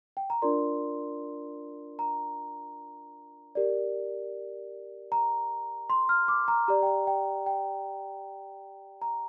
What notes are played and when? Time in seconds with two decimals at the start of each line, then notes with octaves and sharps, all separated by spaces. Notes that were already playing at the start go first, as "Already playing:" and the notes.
0.17 G5
0.30 A#5
0.42 D4 F4 A#4 D5 C6
1.99 A#5
3.55 G4 A#4 D5
5.12 A#5
5.90 C6
6.09 F6
6.28 D6
6.48 A#5
6.68 G4 D5 A#5
6.83 G5
6.87 A#5
7.07 G5
7.46 G5
9.02 A#5